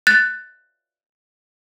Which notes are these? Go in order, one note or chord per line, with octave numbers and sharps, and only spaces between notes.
F#6 A6